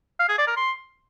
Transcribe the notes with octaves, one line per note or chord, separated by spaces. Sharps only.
F5
G#4
D5
A#4
C6